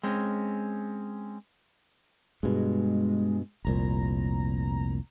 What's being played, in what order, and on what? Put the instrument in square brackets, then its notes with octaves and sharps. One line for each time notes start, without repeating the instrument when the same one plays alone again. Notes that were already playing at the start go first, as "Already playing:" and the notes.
[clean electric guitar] G#3 C4 C#4
[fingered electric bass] G2 B2 [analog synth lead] G#3
[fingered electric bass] F1 C2 A#2 [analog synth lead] A#5